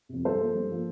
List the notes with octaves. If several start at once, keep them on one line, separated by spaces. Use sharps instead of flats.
F2 C3
G2 A4 C5
F3 A#3
G2
F3 A#3